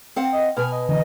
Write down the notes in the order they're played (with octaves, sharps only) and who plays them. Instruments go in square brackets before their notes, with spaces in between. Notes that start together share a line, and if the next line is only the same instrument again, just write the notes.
[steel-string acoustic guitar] C4 F5 F#5
[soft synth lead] D#5
[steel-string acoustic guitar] B2 B4 G#5 [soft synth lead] F6
[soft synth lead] D#5
[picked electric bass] D3 E3 [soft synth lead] D#5